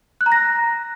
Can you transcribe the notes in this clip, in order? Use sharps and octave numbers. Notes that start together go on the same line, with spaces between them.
F#6
A#5
A#6